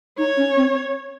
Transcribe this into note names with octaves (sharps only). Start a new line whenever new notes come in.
D#4 C#5
C#4
C4